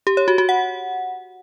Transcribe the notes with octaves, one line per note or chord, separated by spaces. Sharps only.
G4
C#5
F#4
F#4
F#5